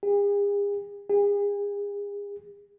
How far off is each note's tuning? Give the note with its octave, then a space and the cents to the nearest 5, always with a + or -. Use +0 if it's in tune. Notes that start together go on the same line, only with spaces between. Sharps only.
G#4 -45
G#4 -40